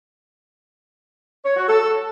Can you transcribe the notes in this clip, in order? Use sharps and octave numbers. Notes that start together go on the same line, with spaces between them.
C#5
F#4
A4